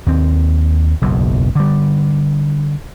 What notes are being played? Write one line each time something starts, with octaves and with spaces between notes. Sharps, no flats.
D#2 C4
F#1 B1 E2
D3 G3